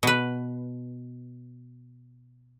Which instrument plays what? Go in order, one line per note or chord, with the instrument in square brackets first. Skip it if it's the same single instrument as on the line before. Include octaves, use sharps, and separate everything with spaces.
[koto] B2 B4